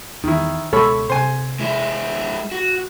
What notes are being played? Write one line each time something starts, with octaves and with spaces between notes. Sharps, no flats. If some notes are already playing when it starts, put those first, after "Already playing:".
E2 D#3 E4
C#2 B2 G#3 A4 C#5 B5
C3 C5 G#5
G#3 E4
F#4